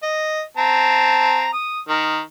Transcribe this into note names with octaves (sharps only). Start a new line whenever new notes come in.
D#5
C4 A5 A#5
D#6
D#3 A#4